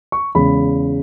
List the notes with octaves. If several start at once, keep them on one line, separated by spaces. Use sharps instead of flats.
C#6
E2 C#3 G#3 B5